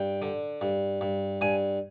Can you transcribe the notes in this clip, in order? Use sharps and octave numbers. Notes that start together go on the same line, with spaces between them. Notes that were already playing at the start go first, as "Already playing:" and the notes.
Already playing: G2 G5
D3
G2
G2
G2 G#5